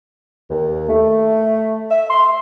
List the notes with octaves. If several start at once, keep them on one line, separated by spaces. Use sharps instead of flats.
D#2
A3
E5
C6